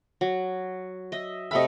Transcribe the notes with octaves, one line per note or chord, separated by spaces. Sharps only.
F#3
D#5 E5
C3 A3 D#5 E5 B5